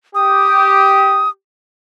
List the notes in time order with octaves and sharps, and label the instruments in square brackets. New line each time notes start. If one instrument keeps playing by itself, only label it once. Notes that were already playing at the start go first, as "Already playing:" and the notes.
[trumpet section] G4 [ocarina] D#6